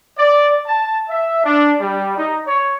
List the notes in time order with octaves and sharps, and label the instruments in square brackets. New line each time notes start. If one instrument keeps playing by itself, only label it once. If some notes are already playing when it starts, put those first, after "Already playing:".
[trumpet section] D5
A5
E5
D4
G3
D#4
C#5